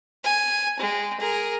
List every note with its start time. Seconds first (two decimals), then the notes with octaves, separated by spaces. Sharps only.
0.24 G#5
0.79 G#3 G5
1.19 G#4 A#4